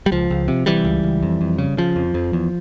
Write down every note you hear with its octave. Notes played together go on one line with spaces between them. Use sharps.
G3
C#2 F3
C#2
C3
C3 E3 G3
C#2
C#2
F2
F2
C#3
C#3 F3
F2
F2
E2